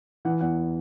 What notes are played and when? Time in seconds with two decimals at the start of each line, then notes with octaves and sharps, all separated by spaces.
0.25 E3 F#5
0.41 E2 F#5